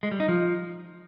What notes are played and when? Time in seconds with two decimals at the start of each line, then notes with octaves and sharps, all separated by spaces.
0.03 G#3
0.11 G3
0.20 D#4
0.28 F3